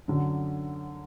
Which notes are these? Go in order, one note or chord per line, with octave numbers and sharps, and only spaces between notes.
F#2 D3 F#3